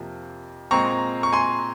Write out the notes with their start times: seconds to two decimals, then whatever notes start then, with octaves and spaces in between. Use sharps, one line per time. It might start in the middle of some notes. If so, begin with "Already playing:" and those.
Already playing: F2 C3 F3 A#3
0.71 A#2 G#3 C4 A#5 C#6
1.23 C#6
1.33 G#5 C6